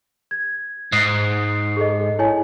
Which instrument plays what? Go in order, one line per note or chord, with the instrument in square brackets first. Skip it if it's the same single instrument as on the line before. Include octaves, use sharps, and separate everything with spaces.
[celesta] G#6
[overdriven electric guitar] G#2 [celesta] D#6 F#6 C7
[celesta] G#4 A4 D#5
E4 C#5 G#5